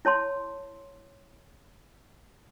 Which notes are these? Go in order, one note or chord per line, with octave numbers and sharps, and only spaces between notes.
E4 C#5 A5 C6